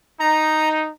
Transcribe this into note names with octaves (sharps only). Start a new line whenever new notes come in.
D#4 A#5